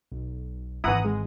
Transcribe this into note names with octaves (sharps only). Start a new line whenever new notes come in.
B1
G#1 D#3 E3 E4 F#5 A#5 D#6
G#3